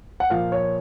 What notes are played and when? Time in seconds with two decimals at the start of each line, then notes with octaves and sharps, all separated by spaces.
0.20 F#5
0.30 A#2 F3 F5
0.52 C#5